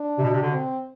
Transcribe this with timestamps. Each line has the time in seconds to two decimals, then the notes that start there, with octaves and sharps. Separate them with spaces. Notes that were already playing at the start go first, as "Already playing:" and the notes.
Already playing: D4
0.18 C3
0.23 B2
0.33 C3
0.42 B2 D3
0.52 C4